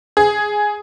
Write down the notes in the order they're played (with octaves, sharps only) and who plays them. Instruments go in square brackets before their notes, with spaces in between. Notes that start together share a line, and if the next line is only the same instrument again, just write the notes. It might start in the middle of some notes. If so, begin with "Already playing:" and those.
[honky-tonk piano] G#4